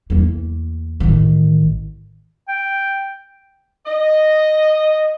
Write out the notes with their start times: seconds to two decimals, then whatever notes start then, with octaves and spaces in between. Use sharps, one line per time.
0.10 E2 A#3
1.00 A1 D#3
2.48 G5
3.86 D#5